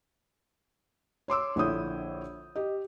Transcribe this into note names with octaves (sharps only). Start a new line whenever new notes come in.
C#5 C6 D6 E6
A#1 D3 E4 C#5 D#6 G6
G4 D#5